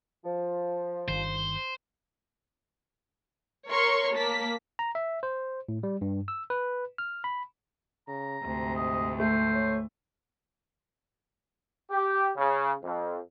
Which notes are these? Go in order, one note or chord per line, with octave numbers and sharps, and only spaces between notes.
F3
G1 D#3 C5
A#4 C#5 C6 C#6
A#3 A5 B6
A#5
E5
C5
A2
G3
G2
E6
B4
F6
B5
C#3 A#5
D2 G#2 C3
D#5
A3 C5
C#5
G4
C#3
F2